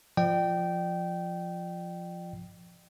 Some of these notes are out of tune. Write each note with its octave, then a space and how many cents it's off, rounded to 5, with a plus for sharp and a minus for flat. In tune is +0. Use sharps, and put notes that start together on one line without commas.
F3 +0 D5 +40 G5 -15